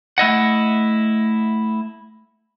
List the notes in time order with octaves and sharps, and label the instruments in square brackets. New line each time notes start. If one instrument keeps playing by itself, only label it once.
[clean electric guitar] A3 E4 D#5 F#5